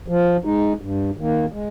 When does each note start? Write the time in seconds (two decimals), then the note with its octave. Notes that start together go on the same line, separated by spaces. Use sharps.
0.08 F3
0.45 G#3 D#4
0.81 G2
1.17 D#3 A#3
1.52 G#3